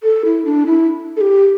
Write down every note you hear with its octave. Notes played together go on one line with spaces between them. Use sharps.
A4
E4
D4
E4
A4
G4